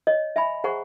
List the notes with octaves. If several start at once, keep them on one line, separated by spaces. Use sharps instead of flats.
C#5 D#5
E5 G#5 B5
G#4 C5 F#5 G#5 A#5 C#6